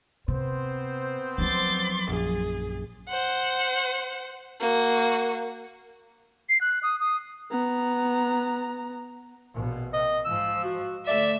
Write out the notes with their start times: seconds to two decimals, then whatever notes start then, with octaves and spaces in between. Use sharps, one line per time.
0.28 C3 B3 C4 C5
1.38 F3 F#3 C6 D6 A6
2.09 A#1 F#2 G#4
3.09 C5 F#5
4.60 A#3 F#4
6.49 C7
6.61 F#6
6.83 D#6
7.00 D#6
7.51 B3 A#5
9.54 A#1 B2
9.94 C3 D#5
10.25 G#2 F3 E6
10.64 F#4
11.07 D3 A3 D5 E5